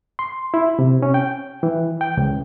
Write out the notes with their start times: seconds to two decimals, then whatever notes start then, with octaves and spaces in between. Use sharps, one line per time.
0.19 C6
0.54 E4
0.79 C3
1.02 C#4
1.14 G5
1.63 E3
2.01 G5
2.17 C#2